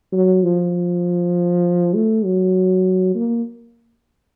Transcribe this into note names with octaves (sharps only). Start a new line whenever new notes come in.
F#3
F3
A3
F#3
A#3